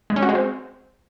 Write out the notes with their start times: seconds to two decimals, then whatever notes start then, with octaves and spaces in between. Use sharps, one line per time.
0.10 G#3
0.16 C#4
0.23 F#4
0.29 G#3
0.35 C4